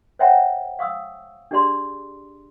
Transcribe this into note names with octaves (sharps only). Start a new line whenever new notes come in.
C5 C#5 E5 F#5 G5 A#5
F5 C#6 D#6 E6
D4 G4 G#4 D5 A#5 C6